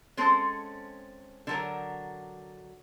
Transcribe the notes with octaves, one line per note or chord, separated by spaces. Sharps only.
G#3 C4 C#4 A4
D3 F#3 A#4